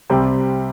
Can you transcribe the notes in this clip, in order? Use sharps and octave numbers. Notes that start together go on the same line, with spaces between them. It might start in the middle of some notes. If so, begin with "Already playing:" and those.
C2 C3 G3 C4